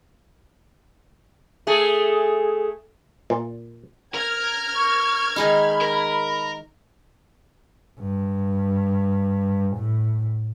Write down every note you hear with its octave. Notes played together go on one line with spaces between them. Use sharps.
A3 G#4
A#2
A#4 F6 G#6 F7
C#6
D#3 G#3 D#4 B5
A#4
G2
A2